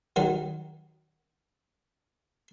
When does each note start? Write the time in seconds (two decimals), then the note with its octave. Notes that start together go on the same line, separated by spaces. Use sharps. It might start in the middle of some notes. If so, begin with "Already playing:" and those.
0.16 D#3 F#3 D#4